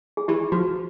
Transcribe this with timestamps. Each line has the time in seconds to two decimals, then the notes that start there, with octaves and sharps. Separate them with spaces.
0.17 G#4
0.28 E3 G4
0.52 F3 F#4